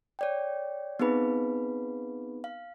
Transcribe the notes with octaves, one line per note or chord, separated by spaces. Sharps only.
C#5 D5 G5
B3 C4 D#4 G#4 B4 B5
F5